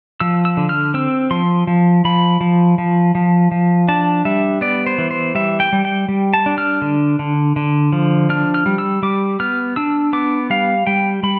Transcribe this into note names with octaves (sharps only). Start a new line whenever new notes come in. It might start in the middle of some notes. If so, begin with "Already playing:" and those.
F3 E6
E6
D3
F6
C4 E6
F3 C6
F3
F3 B5
F3
F3
F3
F3
D4 A5
G3 E5
B3 D5
C5
E3
C5
G3 E5
G5
G3
G5
G3
A5
D4
F6
D3
D3
D3
F3
D4 F6
F6
G3
E6
G3 D6
B3 F6
D4 E6
B3 D6
G3 F5
G3 G5
G3 B5